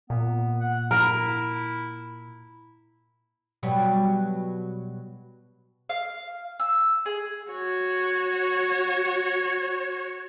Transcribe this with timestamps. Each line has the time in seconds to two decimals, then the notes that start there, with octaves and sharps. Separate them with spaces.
0.10 A#2 B3
0.61 F#5
0.91 E4 A#4
3.63 B2 F#3 G3
5.89 F5
6.60 E6
7.06 G#4
7.50 F#4 C#5